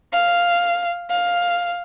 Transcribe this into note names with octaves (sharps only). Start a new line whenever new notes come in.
F5
F5